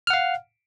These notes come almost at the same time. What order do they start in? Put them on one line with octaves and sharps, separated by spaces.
F6 F#5 F5